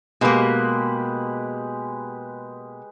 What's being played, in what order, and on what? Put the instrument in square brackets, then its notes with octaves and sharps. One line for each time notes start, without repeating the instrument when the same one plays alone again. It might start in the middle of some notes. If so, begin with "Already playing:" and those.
[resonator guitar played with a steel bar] B2 A#3 [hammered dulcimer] G#3 G4 B4